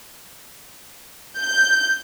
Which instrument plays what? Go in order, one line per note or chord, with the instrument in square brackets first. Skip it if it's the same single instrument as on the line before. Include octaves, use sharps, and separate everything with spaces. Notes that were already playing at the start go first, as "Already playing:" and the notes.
[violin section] G6